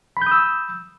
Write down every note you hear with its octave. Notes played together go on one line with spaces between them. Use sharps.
B5 D#6 E6 G6